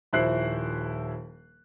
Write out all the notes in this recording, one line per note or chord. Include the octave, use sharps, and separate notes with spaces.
D#1 F3 E4 C5 F#6 C7